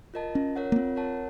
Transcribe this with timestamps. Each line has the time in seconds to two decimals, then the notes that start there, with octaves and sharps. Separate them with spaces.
0.14 F4 A#4 D#5 A5
0.35 C#4 F4
0.56 A#4 C#5 F#5
0.72 A#3
0.76 C4 F4
0.96 A#4 C#5 F#5 A5